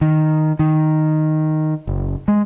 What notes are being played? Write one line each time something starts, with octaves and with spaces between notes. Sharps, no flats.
D#3
D#3
F#1
G#3